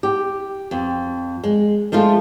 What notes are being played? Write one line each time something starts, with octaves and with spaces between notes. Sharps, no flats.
G4
F2
G#3
F3 G#3 A3 F4